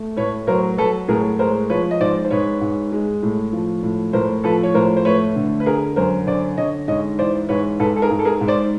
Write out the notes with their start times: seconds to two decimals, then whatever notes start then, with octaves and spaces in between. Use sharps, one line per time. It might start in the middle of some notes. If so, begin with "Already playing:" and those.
Already playing: A3
0.17 A2 B4 C#5
0.47 F#3 A#4 C5
0.78 F#3 A4 B4
1.08 A2 G#4 A#4
1.39 G#3 A#4 C5
1.70 F3 B4 C#5
1.91 D#5
2.00 G#2 C5 D5
2.25 C5
2.31 G#2 B4 C#5
2.61 G#2
2.92 G#3
3.23 A2
3.53 F3
3.83 A2
4.13 A2 A#4 C5
4.44 F3 A4 B4
4.63 C#5
4.74 A2 A#4 C5
4.97 C5
5.05 A3 B4 C#5
5.36 D3
5.60 B4
5.66 D3 G#4 A#4
5.96 F#2 A#4 C5
6.27 D3 C5 D5
6.57 D3 C#5 D#5
6.88 G#2 C#5 D#5
7.19 E3 C5 D5
7.49 G#2 B4 C#5
7.80 G#2 A4 B4
7.96 A4
8.02 G#4 A#4
8.10 G#2
8.19 A4
8.25 G#4 A#4
8.41 G#2
8.48 C5 D5